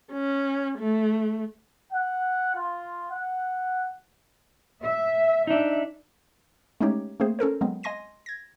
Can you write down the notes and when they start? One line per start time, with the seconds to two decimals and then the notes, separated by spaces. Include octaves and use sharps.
0.12 C#4
0.79 A3
1.93 F#5
2.54 F4
3.11 F#5
4.83 E5
5.47 D4 D#4 E5
6.81 G#3 A3 C#4 D#4 G4 C#5
7.20 A3 A#3 C4 G#4 C5
7.39 C#4 A4 A#4 C5
7.61 F#3 G#3 B3 C4
7.83 D#5 G#5 C6 A#6 D#7
8.26 G#6 A#6